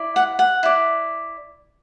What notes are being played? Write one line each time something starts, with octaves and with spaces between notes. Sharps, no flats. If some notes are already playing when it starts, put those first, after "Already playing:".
Already playing: E4 D5
F#5
F#5
E4 D5